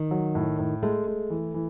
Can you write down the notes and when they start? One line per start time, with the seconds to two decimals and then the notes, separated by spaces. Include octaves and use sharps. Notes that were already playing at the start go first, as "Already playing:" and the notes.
Already playing: D#3
0.11 F#3
0.35 A2
0.59 A2
0.83 G#3 A3
1.07 G#3
1.30 E3
1.54 E3